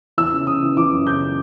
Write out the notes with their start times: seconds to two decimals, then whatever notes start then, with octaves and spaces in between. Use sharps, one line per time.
0.18 E3 E6
0.33 C#3
0.47 C#3 D#6
0.63 E3
0.76 E3 D6
0.91 F#2
1.06 C#3 G6